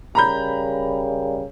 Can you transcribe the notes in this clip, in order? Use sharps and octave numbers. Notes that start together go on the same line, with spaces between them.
C#3 G3 A#4 A#5 B5 G6